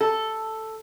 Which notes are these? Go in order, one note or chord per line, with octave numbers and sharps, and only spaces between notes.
A4